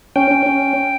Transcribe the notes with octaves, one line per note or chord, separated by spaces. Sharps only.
C#4 G5
C#4
C#4